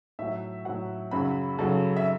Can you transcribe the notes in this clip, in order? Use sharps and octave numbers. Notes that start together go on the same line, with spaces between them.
A2 F#3 E5
A2 F#3 F#5
F#2 C#3 F#3 B5
F#2 C#3 F#3 A4
E5